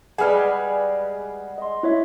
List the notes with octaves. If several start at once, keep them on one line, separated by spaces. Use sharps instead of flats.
G3 G#3 B3 G#4 B4 F#5 F6
D#5 C6
E4 C#5 E5